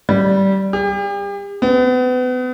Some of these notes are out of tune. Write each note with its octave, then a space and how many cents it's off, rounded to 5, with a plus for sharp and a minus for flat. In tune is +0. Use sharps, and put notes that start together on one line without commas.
G3 -15
G4 +40
B3 +35